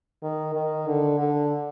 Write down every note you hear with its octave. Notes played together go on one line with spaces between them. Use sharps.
D#3
D#3
D3
D3